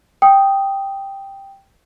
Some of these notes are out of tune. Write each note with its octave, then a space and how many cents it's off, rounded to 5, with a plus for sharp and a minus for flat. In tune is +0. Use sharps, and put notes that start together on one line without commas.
G5 +0 D#6 +0